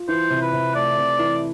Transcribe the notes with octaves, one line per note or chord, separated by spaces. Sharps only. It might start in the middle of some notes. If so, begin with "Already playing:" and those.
Already playing: F4
E3 C5
C3
B4
C3
A3 D5
C3
E3